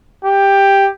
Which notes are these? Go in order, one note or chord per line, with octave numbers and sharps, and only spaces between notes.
G4